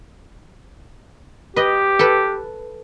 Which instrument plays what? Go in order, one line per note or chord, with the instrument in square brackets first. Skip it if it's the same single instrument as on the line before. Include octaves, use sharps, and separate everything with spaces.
[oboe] G4 [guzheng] B4 D#5
[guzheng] A4 B4